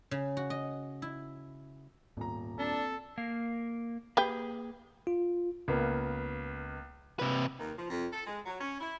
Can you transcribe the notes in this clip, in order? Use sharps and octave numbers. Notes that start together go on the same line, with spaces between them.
C#3
F#4
D#5
E4
D#1 G#2 B3 A#5
C4 D4 A4
A#3 A#4 F5
A#3 G4 G#4 B4 G5
F4
C#2 A#3 B3
C3 B4
D#2
F3
F2
A4
G#3
F#3
C#4
E4